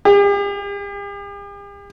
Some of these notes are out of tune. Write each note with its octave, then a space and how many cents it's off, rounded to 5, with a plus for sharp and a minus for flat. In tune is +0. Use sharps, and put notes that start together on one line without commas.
G4 +45